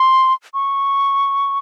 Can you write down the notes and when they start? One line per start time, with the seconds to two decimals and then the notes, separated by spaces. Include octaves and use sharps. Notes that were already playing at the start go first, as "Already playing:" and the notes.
Already playing: C6
0.54 C#6